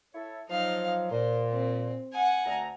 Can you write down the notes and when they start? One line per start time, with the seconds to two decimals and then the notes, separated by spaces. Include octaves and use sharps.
0.14 E4 A4 C#5
0.49 F3 F#3 D#4 F5
1.11 A#2 C5
1.49 C4
2.13 F#5 G#5
2.45 D2 A#5